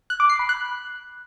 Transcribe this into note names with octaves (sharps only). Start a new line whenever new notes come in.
F#6
D6
C7
B5
F#6